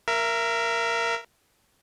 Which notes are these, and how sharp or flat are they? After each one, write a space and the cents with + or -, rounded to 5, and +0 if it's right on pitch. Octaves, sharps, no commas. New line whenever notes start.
A#4 +0 E5 +30